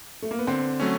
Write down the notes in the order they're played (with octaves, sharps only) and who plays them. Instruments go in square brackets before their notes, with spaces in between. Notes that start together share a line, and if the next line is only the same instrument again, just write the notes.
[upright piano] A3
A#3
B3
[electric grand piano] D3 [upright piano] C4
[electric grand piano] F#3 A3 C#4